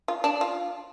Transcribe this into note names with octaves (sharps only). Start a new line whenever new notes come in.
F4
D4
F4